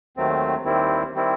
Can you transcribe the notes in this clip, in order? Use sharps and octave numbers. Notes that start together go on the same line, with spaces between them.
D#2 D#3 F#3 A3 C4
D#2 D#3 G3 C4 E4
D#3 G3 C4 E4